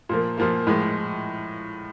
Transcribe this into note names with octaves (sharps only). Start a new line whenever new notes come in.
A#2 F3 A#3
A#2 F3 A#3
A2 F3 G#3